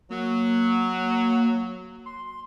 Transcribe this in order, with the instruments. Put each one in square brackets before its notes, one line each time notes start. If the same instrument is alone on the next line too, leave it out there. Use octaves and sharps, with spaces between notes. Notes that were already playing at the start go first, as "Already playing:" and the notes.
[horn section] F#3 [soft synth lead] A#3
[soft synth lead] C6